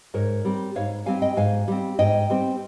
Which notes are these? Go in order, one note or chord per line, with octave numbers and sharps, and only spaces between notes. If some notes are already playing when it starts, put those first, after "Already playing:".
G#2 A#4 C#5
G3 C4
G#2 C#5 F5
G3 C4 F5 G#5
D#5 G5
G#2 F5 G#5
G3 C4
G#2 D#5 G5
G3 C4